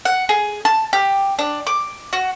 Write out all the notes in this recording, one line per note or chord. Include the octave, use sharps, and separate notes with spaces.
F#5
G#4
A5
G4
D4
D6
F#4